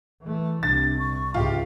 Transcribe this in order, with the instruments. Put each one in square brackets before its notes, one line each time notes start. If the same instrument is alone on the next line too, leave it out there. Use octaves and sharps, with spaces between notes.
[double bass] E3 A3
[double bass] C2 C3 [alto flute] D4 [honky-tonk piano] A6
[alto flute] C#6
[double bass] C#2 G#2 [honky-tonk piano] F4 G4 [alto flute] E5